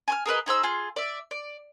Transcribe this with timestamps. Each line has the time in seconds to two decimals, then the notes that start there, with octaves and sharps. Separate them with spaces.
0.08 G#5 C#6 F6
0.26 G#4 A#4 B4 D#5
0.46 D#4 G#4 C5 E6
0.63 F4 G#4 C6
0.96 D5 E5
1.31 D5